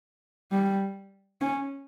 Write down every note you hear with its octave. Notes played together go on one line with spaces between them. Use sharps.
G3
C#4